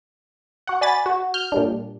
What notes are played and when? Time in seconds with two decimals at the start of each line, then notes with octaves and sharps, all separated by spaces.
0.67 F#4 F#5
0.81 D5 G#5 B5 A6
1.06 F#4
1.34 F6 G6
1.52 A#2 G3 D4